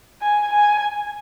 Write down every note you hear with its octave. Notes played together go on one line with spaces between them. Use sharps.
G#5
G#5